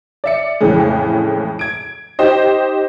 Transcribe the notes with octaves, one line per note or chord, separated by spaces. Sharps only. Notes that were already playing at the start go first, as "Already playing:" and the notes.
D5 E5 C#7
F2 A2 C#3 E3 G#3
G#6 D7
D#4 G4 C5 D#5